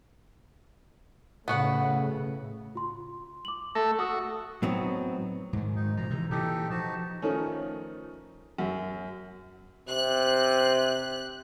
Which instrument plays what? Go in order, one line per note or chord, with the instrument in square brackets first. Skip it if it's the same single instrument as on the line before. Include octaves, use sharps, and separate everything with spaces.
[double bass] A2 C#3 [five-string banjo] B3 F#4 F#5
[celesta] F4 C6
D6 F#7
[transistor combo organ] A3 A4 [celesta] A#6
[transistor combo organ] F#4 [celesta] A4 D#6 E6
[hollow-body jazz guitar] A2 F#3 B3 C4 D#4
[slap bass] G#2 D#3
[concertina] D#4
[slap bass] B2 F3 [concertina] A#5
[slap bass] C3 D#3 E3
[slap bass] A#2 E3 [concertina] D#4 G4 A4
[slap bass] F3 [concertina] D#4 F#4 A5
[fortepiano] D#3 F3 A3 C#4
F#2
[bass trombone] C3 [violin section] F#6